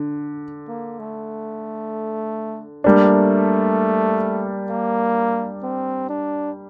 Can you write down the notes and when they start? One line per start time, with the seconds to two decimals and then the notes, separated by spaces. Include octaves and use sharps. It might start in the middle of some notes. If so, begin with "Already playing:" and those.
Already playing: D3
0.68 A#3
0.99 A3
2.84 G3 A3 A#3 D4
4.70 A#3
5.63 C4
6.09 D4